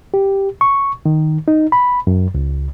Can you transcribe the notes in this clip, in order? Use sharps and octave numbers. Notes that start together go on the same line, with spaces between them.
G4
C#6
D#3
D#4
B5
F#2
C#2